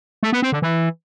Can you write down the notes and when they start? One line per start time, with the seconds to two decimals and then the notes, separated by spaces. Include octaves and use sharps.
0.23 A3
0.33 B3
0.42 C4
0.52 D3
0.62 E3